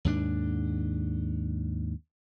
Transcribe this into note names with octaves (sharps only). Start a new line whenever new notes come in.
D#2 G#2 D4